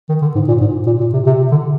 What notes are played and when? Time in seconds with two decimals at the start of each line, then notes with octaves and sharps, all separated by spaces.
0.09 D#3
0.22 D3
0.35 G#2
0.48 A#2
0.61 G#2
0.87 A#2
1.00 A#2
1.14 C3
1.27 C3
1.51 D3